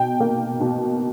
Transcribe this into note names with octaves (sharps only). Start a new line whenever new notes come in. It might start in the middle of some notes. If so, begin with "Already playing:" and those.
Already playing: B2 G5
A#3
B2